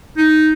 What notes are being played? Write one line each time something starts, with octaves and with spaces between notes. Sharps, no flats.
D#4